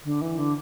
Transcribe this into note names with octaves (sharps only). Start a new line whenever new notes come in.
D3
E3
D3